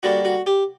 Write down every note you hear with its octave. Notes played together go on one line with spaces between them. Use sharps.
D3 G3 A#3 F#4
F#4
G4